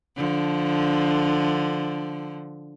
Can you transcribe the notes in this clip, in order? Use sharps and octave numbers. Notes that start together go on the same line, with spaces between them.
D3 F3